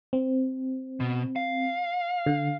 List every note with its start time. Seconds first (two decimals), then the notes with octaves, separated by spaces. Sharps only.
0.13 C4
1.00 B2
1.36 F5
2.26 D3